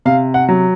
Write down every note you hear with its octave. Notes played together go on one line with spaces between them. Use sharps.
C3 F5
F#5
F#3